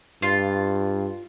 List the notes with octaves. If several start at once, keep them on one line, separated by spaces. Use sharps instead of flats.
G2 F4